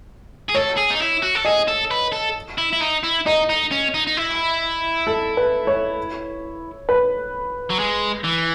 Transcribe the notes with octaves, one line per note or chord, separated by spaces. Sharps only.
G#4
A4 C#5
G#4
D#4
E4
F#4
A4
G#4 D#5
A4
B4
A4
E4
E4
D#4
E4
D#4 D#5
D#4
C#4
D#4
D#4
E4
A4
B4
C#5
B4
F#3
G#3
E3